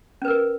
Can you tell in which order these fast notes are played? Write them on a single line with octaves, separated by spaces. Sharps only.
C#4 B4 A#4